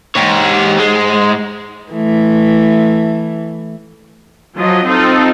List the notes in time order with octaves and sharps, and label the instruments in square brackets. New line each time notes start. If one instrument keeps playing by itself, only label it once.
[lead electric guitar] G#2 [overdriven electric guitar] G4 C#5
[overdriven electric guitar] G#3
[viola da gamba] E3 A3
[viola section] F3 F#3 D#5
C4 D#4 F4 A4